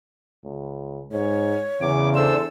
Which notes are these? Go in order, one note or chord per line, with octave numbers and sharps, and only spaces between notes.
C#2
G#2 C#5
E2 C#3 D6
D4 A4 C5 E6